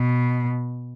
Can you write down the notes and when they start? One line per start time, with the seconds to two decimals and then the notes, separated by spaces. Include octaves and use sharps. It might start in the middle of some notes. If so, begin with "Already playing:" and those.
Already playing: B2